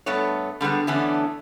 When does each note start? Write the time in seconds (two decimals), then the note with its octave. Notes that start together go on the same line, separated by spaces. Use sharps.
0.06 G2 A3 B3 C#5
0.61 D3 G3 G#3 B3
0.87 D3 E3 A3 B3 C#4 D4